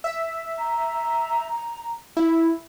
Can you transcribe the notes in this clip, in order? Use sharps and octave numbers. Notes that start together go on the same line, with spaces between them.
E5
A#5
E4